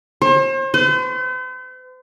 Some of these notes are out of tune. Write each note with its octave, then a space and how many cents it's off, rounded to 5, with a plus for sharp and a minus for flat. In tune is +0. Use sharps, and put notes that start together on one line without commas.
C5 +40
C5 -45